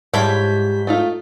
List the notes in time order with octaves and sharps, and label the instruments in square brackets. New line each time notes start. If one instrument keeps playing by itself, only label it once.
[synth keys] G#2 G6 B6 [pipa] F3 E4 C#5 [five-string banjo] G3 G4
[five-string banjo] A3 D#4 F4